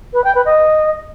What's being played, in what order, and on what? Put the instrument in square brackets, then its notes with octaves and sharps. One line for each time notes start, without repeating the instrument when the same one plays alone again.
[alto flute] B4
G5
B4
D#5